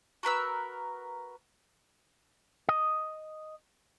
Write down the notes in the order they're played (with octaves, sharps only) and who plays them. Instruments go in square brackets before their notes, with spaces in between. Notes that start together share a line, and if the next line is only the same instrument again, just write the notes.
[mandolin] F#4 A#4 B4 E6
[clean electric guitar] D#5